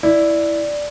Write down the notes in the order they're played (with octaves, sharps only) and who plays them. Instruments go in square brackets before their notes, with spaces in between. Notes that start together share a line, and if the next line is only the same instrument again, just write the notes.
[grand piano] E4 [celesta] D5